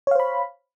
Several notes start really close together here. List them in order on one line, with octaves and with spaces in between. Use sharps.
C#5 F5 C5 B5